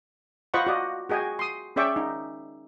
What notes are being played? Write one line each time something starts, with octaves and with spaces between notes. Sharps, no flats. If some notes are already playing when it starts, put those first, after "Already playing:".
F4 C5 D#5 F#5 B5 C#6
F#4 D5 D#5
F#4 G#4 D#5 G5 G#5
C6 D#6
C#4 G#4 D5 E5 G5 C#6
D#4